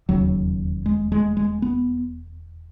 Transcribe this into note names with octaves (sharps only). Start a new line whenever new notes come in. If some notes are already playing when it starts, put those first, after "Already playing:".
E1 D#2 C#3 F#3
G#3
G#3
G#3
B3